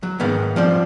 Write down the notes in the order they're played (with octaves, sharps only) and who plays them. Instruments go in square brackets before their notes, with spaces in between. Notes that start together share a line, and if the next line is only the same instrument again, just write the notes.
[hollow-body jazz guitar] F#3
G#2 D#3 A#3 B3
F3 G3 C4